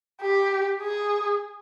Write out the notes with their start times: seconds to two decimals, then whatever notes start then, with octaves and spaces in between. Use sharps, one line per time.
0.22 G4
0.82 G#4